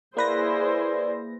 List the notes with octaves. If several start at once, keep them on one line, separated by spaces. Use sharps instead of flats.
A#3 E4 G#4 B4 C5 D5 A#6